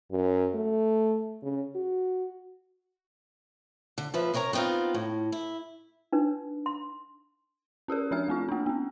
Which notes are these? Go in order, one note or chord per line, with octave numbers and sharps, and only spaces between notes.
F#2
A3
C#3
F#4
D3
D#2 F3 B4 E5
C3 A#4 C#5 E5 A#5
B3 C4 D4 D#4 F4
A2
E4
D4 D#4 B4
C6
C#4 G4 G#4 A#4
F3 D4 E5 F6
A3 C4 F4
A#3 D4
B3 C#4